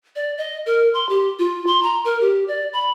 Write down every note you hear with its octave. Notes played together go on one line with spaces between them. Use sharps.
D5
D#5
A#4
C6
G4
F4
C6
A#5
A#4
G4
D5
B5